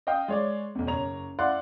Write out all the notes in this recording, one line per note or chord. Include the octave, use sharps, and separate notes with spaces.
D#5 F5 G5 D#6
G#3 C#5 D5
B1 E2
F#1 C#5 A#5 F7
E4 D5 F5 F#5 C6 F#6